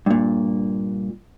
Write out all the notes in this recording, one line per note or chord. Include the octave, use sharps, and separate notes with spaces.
G2 A#2